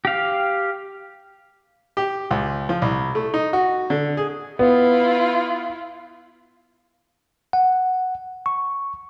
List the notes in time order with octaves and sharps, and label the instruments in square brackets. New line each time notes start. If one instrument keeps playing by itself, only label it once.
[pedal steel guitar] G4 F5
[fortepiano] G4
C#2
F3
C2
A3
D#4
F#4
D3
G#4
[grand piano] B3 [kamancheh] E4 F4
[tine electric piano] F#5
C#6